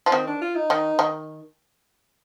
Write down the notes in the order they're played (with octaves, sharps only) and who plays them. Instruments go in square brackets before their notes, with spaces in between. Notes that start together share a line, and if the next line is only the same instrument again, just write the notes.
[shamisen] F3
[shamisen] D#3 [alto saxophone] C4
[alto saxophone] D4
F4
D#4
[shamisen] D#3
D#3